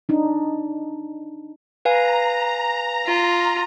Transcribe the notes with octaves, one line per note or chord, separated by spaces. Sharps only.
D4 D#4
B4 F5 G#5 A#5
F4